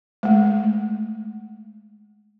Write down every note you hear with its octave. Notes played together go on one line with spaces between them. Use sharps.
G#3 A3